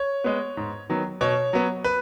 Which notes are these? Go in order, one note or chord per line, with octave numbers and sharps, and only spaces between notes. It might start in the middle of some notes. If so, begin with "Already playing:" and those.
Already playing: C#5
G#3 B3
G#2
D#3 F#3 B3
B2 C#5
F#3 B3
B4